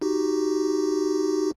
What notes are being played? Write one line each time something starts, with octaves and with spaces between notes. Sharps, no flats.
D#4 F#4 G4